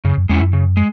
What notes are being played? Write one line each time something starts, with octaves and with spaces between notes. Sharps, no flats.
F#2 C#3
F#2
E2 G#3 C#4 E4
F#2
C#3
G#3